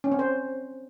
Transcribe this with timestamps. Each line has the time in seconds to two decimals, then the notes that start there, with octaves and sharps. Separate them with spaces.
0.04 C#4
0.12 C4
0.19 C5